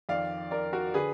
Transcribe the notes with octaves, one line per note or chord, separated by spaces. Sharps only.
F2 D#3 D5 F5
A#4 D5
F#4 A#4
D3 G#4 B4